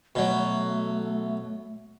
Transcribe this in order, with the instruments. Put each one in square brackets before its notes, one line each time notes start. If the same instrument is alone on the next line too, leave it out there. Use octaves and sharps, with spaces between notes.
[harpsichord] B2 F#3 [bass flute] A3